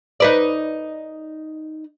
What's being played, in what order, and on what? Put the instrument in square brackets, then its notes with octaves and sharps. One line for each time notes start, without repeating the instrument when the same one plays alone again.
[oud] D#4 B4 D5